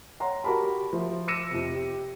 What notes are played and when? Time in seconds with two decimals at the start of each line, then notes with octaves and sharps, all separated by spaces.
0.20 C#5 F#5 A#5 C6
0.44 F#4 G4 A#4 A5 B5
0.93 F3 E5
1.28 D6 E6 A#6 C#7 D#7 E7
1.51 F2 C3
1.75 G4